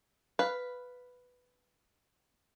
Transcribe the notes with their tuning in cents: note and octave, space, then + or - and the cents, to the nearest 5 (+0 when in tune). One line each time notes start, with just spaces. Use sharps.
B4 +5 F5 +0